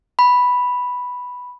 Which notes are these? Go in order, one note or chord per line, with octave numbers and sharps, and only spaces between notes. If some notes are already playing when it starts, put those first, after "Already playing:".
B5